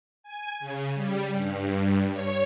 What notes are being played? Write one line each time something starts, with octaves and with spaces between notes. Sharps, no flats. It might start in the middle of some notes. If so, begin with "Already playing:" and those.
G#5
C#3
G3
G2
C#5